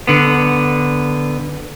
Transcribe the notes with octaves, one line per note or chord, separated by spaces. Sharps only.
D3 B3